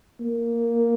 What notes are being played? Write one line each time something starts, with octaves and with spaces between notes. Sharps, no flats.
A#3